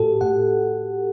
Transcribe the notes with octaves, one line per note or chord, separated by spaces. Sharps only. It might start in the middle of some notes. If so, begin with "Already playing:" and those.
Already playing: A2 F#4 G4 A4
A2 F#5